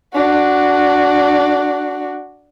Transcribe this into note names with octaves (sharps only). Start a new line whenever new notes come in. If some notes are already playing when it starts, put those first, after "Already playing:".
D4 F#4